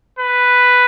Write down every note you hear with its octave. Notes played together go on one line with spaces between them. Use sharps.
B4